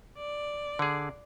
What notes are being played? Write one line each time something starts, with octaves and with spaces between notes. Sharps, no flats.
D5
D3 G#4